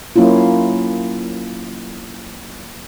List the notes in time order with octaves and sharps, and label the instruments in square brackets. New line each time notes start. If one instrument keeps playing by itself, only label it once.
[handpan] F#3 A#3 C#4 E4 F4